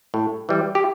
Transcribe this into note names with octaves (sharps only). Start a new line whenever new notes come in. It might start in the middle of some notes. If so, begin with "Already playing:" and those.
A2
E3 G3
G4